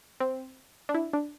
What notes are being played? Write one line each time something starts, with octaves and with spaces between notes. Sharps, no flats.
C4
D4
E4
D4